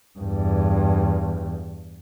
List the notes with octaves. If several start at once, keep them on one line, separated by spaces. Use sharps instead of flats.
E2 G2